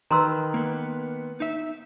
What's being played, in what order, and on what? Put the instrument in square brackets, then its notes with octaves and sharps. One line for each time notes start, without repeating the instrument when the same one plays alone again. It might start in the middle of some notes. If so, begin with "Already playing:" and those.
[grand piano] D#3 B4 [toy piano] A#5 C6 E6
[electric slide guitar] A#3 B3
D#4 E5